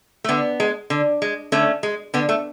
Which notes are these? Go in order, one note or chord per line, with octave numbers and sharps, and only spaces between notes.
A3
D3 B3
G#3
D3
G#3
D3 A3 C#4
G#3
D3 B3
A3